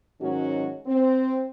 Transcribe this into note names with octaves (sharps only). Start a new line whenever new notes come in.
G#2 D#3 F#3 G#3 C#4 F#4
C4